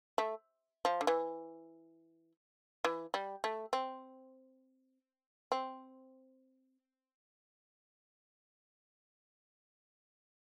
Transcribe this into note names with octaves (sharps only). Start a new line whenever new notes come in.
A3
F3
D3
E3
E3
G3
A3
C4
C4